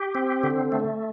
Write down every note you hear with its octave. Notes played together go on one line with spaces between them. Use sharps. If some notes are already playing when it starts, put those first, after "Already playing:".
Already playing: G4
C4
D3
A3